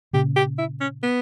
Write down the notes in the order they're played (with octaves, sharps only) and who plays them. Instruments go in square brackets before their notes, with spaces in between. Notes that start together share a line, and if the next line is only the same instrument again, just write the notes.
[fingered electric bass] A#2 C#3 [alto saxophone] G4
[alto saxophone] G4
E4
C#4
B3